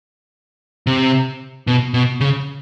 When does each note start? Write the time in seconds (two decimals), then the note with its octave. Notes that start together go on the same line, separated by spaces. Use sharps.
0.87 C3
1.67 B2
1.94 B2
2.21 C#3